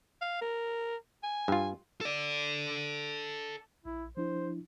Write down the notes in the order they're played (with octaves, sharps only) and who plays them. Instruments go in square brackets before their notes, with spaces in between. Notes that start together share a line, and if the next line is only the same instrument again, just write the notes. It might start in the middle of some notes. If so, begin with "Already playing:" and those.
[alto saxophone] F5
A#4
G#5
[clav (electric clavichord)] G2 F4
[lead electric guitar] A4 D5
[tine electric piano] A#1 [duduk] E4
[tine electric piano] F3 D4 E4 [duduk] C5